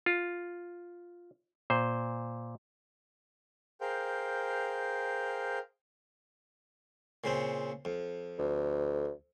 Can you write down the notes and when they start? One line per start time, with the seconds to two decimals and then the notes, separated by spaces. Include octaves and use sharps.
0.06 F4
1.70 A#2 C5
3.81 G#4 A#4 C5 F5 G5
7.24 A#2 C#3 C4
7.85 F2
8.39 D2